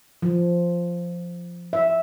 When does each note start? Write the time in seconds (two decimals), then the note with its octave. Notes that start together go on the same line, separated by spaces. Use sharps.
0.22 F3
1.73 E5